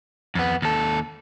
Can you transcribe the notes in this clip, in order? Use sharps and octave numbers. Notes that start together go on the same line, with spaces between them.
F2 B3
D#2 A4